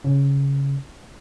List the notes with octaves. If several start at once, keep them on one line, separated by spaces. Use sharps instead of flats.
C#3